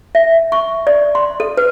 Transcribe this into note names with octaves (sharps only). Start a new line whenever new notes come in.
E5
C#6
D5
C6
A4
B4